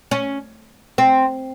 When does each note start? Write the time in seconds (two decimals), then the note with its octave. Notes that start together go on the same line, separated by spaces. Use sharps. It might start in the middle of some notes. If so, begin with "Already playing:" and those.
0.11 C#4
0.98 C4